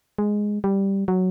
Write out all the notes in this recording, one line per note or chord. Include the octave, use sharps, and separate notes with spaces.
G#3
G3
F#3